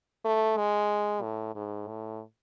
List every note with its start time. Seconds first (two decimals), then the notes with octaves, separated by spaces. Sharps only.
0.25 A3
0.57 G#3
1.22 A2
1.55 G#2
1.87 A2